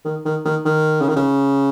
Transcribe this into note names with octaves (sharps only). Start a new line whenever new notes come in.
D#3
D#3
D#3
D#3
C#3
D#3
C#3